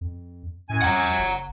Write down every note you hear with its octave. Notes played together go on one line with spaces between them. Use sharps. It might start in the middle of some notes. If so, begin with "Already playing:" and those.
F2
F#2 A2 G#5
F2 F#5 A#5
F#1